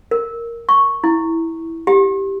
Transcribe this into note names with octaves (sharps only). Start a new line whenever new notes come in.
A#4
C#6
E4
G4